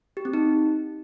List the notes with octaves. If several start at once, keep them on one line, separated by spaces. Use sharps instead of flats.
G4
C4
D#4